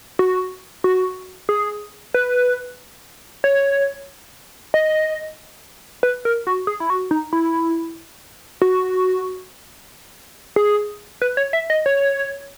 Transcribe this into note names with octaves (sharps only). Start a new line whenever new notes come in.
F#4
F#4
G#4
B4
C#5
D#5
B4
A#4
F#4
G#4
E4
F#4
D#4
E4
F#4
G#4
B4
C#5
E5
D#5
C#5